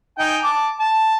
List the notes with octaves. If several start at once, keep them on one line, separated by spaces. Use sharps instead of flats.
D#4 G5 G#5
A5 D6
A5